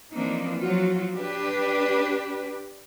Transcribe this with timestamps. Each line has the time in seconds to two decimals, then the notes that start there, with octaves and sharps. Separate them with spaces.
0.13 E3 F3 A#3 C4 D4 D#4
0.59 F3 F#3 F4 F#4
1.14 D4 G4 B4